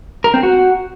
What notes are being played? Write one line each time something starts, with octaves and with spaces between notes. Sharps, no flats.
A#4
C4
F#4